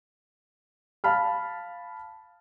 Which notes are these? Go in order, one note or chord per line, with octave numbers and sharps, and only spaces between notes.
F5 A5 B5 F6